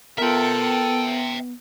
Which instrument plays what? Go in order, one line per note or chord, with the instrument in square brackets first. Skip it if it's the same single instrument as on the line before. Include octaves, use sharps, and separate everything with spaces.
[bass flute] B3 [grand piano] F4 A#4 [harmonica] A4 [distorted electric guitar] E5 G5